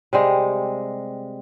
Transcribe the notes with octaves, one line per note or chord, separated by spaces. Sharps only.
C3 G3 G#3